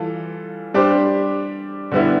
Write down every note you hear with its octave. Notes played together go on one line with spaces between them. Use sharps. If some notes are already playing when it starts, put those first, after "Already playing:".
Already playing: E3 G3 F4 A4
G3 D4 G4 C5
D3 G3 B3 E4